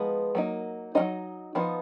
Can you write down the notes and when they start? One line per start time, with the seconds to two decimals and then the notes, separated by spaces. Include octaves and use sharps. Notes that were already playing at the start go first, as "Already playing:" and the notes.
Already playing: F3 G#3 B3 D#4
0.35 F#3 A#3 D#4
0.95 F#3 A#3 D#4 D#5
1.55 F3 B3 D#4